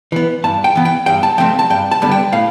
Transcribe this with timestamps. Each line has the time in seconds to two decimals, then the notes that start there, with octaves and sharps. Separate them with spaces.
0.12 E3 B3
0.44 G2 A5
0.64 G5
0.75 E3 B3
0.85 G5
1.06 G2 G5
1.23 A5
1.38 F3 A3 C4 G5
1.59 A5
1.70 G2 G5
1.91 A5
2.02 D3 G3 B3
2.11 G5
2.32 A2 F5